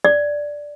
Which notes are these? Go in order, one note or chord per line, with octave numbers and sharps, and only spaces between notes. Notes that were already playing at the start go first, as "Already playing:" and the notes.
D5